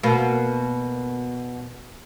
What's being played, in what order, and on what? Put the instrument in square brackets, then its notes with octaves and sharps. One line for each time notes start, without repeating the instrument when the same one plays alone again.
[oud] B2 A#3